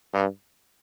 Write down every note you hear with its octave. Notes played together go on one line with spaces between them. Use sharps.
G2